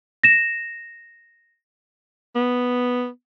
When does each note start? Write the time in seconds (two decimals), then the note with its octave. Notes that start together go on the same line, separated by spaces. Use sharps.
0.24 A#6 E7
2.36 B3